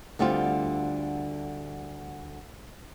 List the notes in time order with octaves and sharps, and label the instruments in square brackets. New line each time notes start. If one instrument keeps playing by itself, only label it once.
[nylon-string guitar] D2 D3 G3 C4 F4